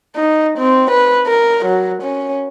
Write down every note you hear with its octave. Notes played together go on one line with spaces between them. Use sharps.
D#4
C4
B4
A#4
F#3
C#4